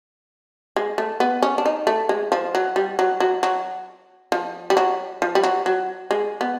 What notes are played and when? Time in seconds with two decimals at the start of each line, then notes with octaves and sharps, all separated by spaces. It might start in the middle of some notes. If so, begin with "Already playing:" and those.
0.76 G#3
0.98 A3
1.20 B3
1.43 C#4
1.58 D4
1.66 D#4
1.87 A3
2.09 G#3
2.32 F3
2.55 F#3
2.76 G3
2.99 F#3
3.20 F#3
3.43 F#3
4.32 F3
4.70 G3
4.77 F#3
5.22 F3
5.35 G3
5.44 F#3
5.66 F#3
6.11 G#3
6.41 B3